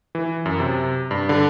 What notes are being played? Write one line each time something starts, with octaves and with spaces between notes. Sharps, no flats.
E3
F#2
C3
G2
D3